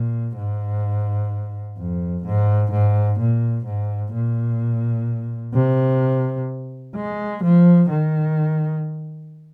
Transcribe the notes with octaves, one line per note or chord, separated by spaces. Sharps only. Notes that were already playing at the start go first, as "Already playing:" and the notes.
Already playing: A#2
G#2
F2
G#2
G#2
A#2
G#2
A#2
C3
G#3
F3
D#3